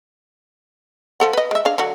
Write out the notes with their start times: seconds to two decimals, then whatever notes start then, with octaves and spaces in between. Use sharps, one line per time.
1.20 F3 A4 F#5
1.33 B4 D#5
1.51 G#3 E5
1.65 D4 G#4 F5
1.78 D3 F#3 F#4